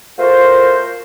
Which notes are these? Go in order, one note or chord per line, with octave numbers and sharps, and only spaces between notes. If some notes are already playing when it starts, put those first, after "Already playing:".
A3 F4 F#4 A#4 C5